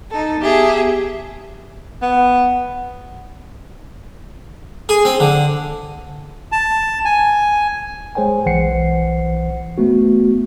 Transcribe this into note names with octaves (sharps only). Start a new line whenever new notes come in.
D#4 A4
B3 G4 G#4 E5
B3
G#4
C4
D3
A5
G#5
G#3 G#4 C5 C#5 G5 G#5
B1 E3 C5 F#5 C7 C#7
A3 B3 F#4